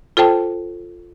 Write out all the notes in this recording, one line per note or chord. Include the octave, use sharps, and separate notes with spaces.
F4 A4 C5 G5 A5